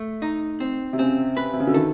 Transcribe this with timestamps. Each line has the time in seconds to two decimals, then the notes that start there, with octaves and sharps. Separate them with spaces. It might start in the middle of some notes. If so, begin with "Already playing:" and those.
Already playing: A3
0.22 D#4
0.60 C4
0.93 C3
0.99 C#3 C4
1.37 B4
1.53 C3
1.60 C#3
1.67 D3
1.74 D#3 A4